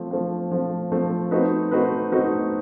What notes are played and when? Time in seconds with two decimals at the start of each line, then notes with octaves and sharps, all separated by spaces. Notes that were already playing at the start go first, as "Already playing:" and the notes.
Already playing: F3 A3 C4
0.11 F3 A3 C4
0.51 F3 A3 C4
0.92 F3 A3 C4
1.31 A3 C4 D#4 F#4 B4
1.71 A3 C4 D#4 F#4 B4
2.11 A3 C4 D#4 F#4 B4